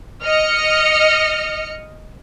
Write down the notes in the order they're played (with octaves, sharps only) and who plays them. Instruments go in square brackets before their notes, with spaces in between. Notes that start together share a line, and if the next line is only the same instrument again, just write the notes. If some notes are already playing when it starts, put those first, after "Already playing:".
[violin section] D#5 F6 C#7